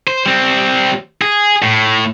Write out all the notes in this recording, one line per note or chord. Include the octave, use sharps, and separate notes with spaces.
C5
G3 C4
G#4
A2